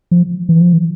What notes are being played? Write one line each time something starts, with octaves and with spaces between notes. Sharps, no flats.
F3
E3
F3
E3